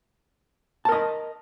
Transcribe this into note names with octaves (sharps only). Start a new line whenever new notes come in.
A#4 D#5 A5